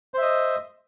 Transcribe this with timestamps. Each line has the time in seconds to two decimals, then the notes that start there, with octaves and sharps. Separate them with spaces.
0.14 C5
0.18 E5
0.22 D#5